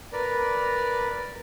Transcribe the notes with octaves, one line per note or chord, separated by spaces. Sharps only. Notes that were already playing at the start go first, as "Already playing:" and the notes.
A#4 B4 D5